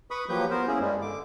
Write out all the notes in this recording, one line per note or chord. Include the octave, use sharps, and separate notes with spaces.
B4 B5 C#6 D#6
F3 F#3 A#3 G4 B4 G6
B3 A#4 C5
A#3 C#4 E4 G#4
G2 G3 G#3
D3 D6